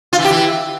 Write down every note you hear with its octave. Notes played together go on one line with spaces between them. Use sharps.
F4
E3
G4
E3